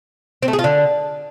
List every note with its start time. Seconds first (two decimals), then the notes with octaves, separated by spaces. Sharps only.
0.42 C4
0.48 A3
0.53 G#4
0.59 F4
0.64 D3